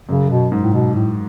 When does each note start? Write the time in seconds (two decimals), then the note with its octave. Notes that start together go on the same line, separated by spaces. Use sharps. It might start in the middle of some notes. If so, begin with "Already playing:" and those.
0.08 F#2 C#3
0.30 B2
0.52 G#2
0.63 A2
0.74 B2
0.95 A2